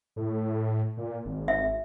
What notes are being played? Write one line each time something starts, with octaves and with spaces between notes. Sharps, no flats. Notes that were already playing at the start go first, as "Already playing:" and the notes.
A2
A#2
G#1
E5